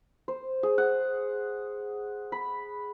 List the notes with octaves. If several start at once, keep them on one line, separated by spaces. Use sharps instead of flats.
C5
G#4
F#5
B5